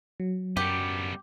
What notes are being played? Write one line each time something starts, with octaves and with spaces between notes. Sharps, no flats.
F#3
F#2 G3 B3 G4